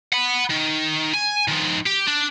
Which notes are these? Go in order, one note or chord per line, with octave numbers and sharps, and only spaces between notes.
F#5 B5
D#3
G#5
D#3 F3
G4
D4